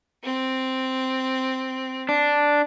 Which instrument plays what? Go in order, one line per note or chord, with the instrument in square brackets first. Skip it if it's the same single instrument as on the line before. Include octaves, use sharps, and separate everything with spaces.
[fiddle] C4
[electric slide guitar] D4